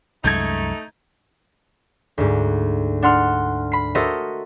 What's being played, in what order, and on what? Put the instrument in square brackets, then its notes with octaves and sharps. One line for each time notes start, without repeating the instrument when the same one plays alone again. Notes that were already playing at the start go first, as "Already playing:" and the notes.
[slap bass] C2 F#2 G#3 [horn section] A3 D#4 [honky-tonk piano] G6 G#6
[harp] D2 G#2
D4 F#5 C6 F6
B5 C7
F#4 A4 A#4 C5 D#5 E5